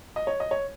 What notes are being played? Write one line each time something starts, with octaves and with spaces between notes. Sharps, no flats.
D#5
C#5
D#5
C#5